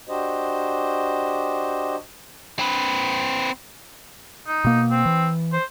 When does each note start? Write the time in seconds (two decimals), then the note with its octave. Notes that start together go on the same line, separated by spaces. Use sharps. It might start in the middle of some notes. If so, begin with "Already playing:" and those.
0.09 D4 F#4 G4 C5 D#5
2.59 C4 B4
4.47 D#4
4.64 B2 A#3
4.91 C4
5.05 E3
5.53 C5